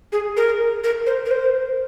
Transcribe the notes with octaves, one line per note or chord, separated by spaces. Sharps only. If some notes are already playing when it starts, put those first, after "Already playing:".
G#4
A#4
A#4
C5
A#4
C5